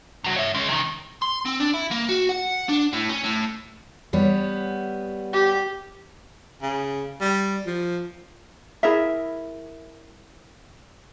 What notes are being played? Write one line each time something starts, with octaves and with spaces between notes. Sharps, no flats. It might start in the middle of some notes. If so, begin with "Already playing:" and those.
C3 F#4
C#5 E5
G#3 C#4
C3 D#3
C6
C4
D4
E4
A#3
F#4
F#5
D4
A2
C#4
A2
G3 B3 C#5
G4
C#3
G3
F3
E4 G#4 A#4 E5